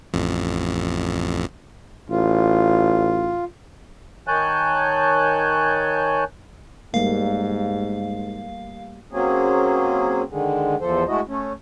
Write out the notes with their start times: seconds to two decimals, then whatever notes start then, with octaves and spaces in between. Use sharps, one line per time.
0.13 A1 F2
2.10 A1 F4
4.28 D#3 C#5 G#5 A5 F#6 G6
6.94 G#2 G3 A3 A#3 F5
9.11 F#3 A#3 C4 C#4 G#4
10.30 D3 D#3 G#3
10.81 E2 F3 A4 C5
11.08 G#3 A3 E4 F#4 D#5
11.28 A3 C#4